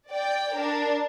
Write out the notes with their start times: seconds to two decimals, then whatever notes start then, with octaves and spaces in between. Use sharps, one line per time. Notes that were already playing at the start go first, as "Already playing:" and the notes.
0.11 D5 G5
0.54 D4 A#4